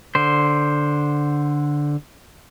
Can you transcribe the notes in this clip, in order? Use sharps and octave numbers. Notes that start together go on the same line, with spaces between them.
D3 C5